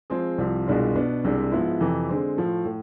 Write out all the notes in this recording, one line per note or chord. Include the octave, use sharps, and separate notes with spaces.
F3 G#3 C4 G#4
C2 C3 F3
C2 B2 G#3 D4 F4
B2 B3 D4
C2 C3 G#3 D4
G#2 F3 B3 E4
F2 C3 E3
D3 G#3 C4
A2 F3 A3
A2